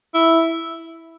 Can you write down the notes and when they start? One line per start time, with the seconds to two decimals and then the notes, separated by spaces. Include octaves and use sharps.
0.14 E4